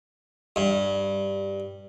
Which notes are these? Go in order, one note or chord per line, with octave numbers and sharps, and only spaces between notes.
G2